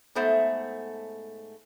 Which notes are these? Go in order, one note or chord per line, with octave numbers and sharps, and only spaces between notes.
G#2 A3 B3 C5 E5